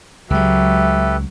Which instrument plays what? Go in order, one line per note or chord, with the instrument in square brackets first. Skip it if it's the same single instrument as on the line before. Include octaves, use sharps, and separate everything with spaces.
[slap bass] C#2 G#3 [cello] F#3 [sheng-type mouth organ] G4 A4 B4 [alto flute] E5